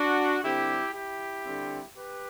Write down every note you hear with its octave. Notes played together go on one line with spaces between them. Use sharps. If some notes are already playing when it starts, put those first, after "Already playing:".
Already playing: D4 F#4
D3 G3 C4 E4 G4
E4 G4
D3 G3 C4
G4 B4